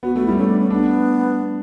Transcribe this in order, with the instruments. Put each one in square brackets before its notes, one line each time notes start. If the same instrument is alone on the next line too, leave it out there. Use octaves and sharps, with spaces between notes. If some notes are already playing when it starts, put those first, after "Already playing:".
[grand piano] B3 [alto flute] F#4
[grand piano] A3 [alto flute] F#4
[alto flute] E4
[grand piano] G3
[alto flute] C#4
[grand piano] A3
[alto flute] D4
C#4
[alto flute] B3 [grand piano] D4